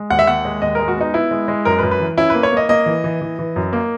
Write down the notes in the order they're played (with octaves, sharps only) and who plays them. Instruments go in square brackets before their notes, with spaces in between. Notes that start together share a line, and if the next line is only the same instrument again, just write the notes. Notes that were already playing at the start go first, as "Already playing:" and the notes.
Already playing: [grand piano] G#3
D#2 F#5
E5
D#2 F#5
G#3
D#2 D#5
G#3 A#4
F#4
B3 D#4
B3 E4
G#3
G#3
F#2 A#4
B4
F#2
B4
E3
C#4 E4
A#3 B4
C#5
A#3 D#5
A#3 D#5
E3
E3
E3
E3
F#2
A#3